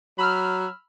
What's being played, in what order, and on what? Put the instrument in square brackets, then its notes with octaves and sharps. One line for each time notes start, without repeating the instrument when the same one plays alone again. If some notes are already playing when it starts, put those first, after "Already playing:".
[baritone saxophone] F#3 [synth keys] B5 E6 F6